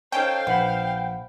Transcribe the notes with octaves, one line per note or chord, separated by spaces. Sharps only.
C#4 D#4 A4 C5 C#5 F5 G5 A5
A#1 B3 F#5 B5